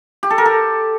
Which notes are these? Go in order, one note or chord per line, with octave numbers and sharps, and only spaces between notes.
G4
A4
A#4
A4